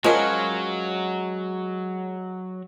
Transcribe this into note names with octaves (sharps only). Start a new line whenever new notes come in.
F3 F#3 G#3 C#4 F4 A#4